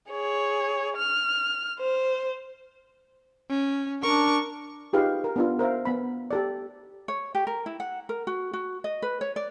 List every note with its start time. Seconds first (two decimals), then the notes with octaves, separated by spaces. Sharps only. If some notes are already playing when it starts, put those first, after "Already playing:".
0.10 G#4 C#5
0.97 F6
1.80 C5
3.49 C#4
4.02 D4 A#4 C#6
4.93 D#4 F4 G4 G#4 B4 F5
5.24 A#4
5.36 B3 D4 F4
5.59 A#4 C5 E5 F5
5.85 B3 B5
6.31 G4 A4 D5
7.08 C#5
7.35 G4
7.47 A#4
7.66 E4
7.80 F#5
8.09 A#4
8.27 F#4
8.53 F#4
8.84 D#5
9.02 B4
9.21 C#5
9.36 D5